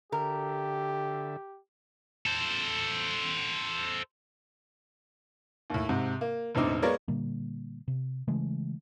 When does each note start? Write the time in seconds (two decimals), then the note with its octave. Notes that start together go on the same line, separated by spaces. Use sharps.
0.12 D3 G4 A4 A#4 E5
2.26 A4 C5
5.70 D#2 A2
5.89 G#2 C3
6.21 A#3
6.55 E1 A2 D3 C4 D#4 D6
6.82 G#3 A#3 B3 A#4 C#5 D5
7.08 A#2 D3 G3 A#3
7.88 C3
8.28 C#3 E3 G#3 A3